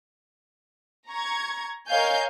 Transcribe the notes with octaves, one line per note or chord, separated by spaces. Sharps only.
A#5 C#6 G#6
A#4 C#5 D#5 F5 G#5 G6